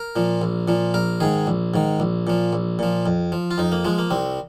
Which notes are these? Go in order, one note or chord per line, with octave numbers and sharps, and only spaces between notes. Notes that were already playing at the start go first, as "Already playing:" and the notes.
Already playing: A#4
A#2 F3
A#1
A#2 F3
A#1 A#4
G#2 D#3 G#4
A#1
G#2 D#3
A#1
A#2 F3
A#1
A#2 F3
F2
F3
F4
F2 D#4
A#3
F3 G#3
A#3
C2 C4